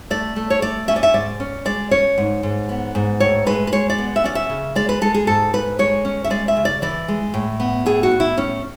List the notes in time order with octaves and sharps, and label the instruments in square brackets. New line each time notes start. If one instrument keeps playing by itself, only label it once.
[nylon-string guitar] A3 D5
A3
C#5
A3 D5
C#4 E5
D5
E5
G#2 D5
C#4
G#3 D5
C#4 C#5
G#2
G#2
B3
G#2
A2 C#5
G#3 B4
B4
G#3 C#5
D5
B3
E5
C#4 D5
E5
C#3
G#3 D5
B4
G#3 A4
G#4
G#2 A4
G#2 B4
G#3 C#5
C#4
E5
G#3 D5
E5
C#3
D5
E3 D5
G#3
A2
B3
A2 G#4
F#4
A2
E4
A2 C#4